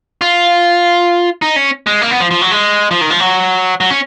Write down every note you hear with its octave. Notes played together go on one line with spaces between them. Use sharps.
F4
D#4
C#4
G#3
A#3
B3
F3
F3
F#3
G#3
F3
D#3
F3
F#3
F#3
C#4